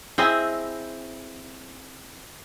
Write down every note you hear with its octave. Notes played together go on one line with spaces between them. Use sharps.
C4 E4 G#4 D#5